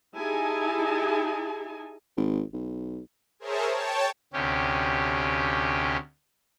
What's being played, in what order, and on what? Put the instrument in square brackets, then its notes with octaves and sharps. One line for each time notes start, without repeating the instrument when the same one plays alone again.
[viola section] D#4 E4 G4 G#4 G#5 A5
[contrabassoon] G#1
B1
[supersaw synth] G#4 A#4 C5 C#5 E5 A5
C#5 G5 A5
[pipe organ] D2 C3 C#4 G4